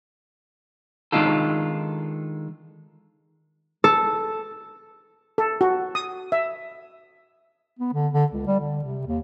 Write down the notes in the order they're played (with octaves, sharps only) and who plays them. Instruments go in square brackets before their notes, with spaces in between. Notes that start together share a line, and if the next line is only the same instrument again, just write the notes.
[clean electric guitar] D#3 G#3 D4 D#4 F4 A4
[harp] A4
[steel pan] A4
F#4
D#6
E5
[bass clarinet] B3
D3
D3
C#2
G3
D3
C3
D#2